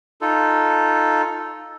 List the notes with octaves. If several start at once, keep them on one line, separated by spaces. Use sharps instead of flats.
D#4 F4 A4